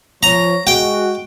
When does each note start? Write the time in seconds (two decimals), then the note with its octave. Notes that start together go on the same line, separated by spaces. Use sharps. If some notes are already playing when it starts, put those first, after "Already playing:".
0.23 F3 C#5 A#5
0.67 G#3 F#4 G5